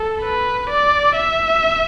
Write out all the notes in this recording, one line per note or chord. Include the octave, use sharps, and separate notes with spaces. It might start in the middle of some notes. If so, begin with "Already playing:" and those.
Already playing: A4
B4
D5
E5